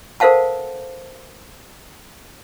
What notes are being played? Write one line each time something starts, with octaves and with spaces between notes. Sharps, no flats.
A4 A#4 C5 F5 F#5 A5